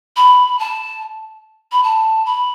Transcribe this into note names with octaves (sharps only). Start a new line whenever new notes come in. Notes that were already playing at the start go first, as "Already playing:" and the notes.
B5
A5
B5
A5
B5